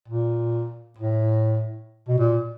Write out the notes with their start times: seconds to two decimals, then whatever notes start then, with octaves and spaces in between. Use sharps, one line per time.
0.08 A#2
0.99 A2
2.09 B2
2.18 A#2